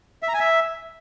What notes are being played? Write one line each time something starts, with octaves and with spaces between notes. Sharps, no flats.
E5
A#5
G#5
E5